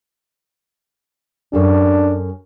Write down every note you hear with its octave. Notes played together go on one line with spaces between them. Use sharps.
F#2 D4 A4